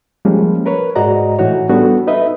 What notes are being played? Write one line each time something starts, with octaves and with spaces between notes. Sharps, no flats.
F3 G3 G#3 A#3 C#4
A#4 B4 C#5
G#2 G#3 F#4 D5 D#5 A#5
A2 E3 D#4 F#4 C#5
G3 B3 D4 F#4 A4
D#4 B4 D#5 E5